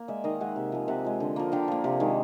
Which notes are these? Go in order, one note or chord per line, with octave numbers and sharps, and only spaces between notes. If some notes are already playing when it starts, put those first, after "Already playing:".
Already playing: A#3
G#3 D5 E5
D#3 D#5 F5
G#3 E5 F#5
C3
F3 G#3
C3 E5 F#5
F3 G#3
D3
F3 A#3
D3 F5 G5
F3 A#3
C3
D#3 G#3